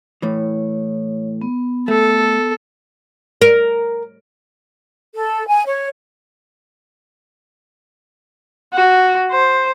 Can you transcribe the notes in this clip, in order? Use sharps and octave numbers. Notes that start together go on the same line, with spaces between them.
A2 E3 C#5
B3
A3 A4
A#4
A4
G#5
C#5
F#4
C5